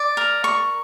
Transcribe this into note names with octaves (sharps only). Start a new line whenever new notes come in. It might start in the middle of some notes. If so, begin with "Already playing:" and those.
Already playing: D5
A#4
C#6